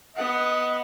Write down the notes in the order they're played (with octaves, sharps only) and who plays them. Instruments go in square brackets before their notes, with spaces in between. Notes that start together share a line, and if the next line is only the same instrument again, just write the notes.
[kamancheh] B3 F#5 [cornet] D#5